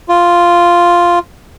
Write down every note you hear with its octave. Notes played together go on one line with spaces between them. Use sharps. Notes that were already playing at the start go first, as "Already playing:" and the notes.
F4